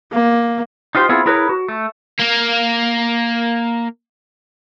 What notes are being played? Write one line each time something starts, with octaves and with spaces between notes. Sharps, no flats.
A#3
D#4 F4 G4 C5
B3 C4 E4 F4 G#4
E4 G#4 A#4 B4 C#5
F#4
A3
A#3 A#4